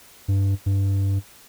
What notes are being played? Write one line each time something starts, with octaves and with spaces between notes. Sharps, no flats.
G2
G2